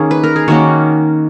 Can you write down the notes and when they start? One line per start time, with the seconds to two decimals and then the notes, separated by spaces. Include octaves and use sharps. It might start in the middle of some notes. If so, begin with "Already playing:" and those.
Already playing: D#3 A#3 C#4 G#4
0.11 B4
0.24 A#4
0.36 G#4
0.48 D#3 A#3 C#4 F#4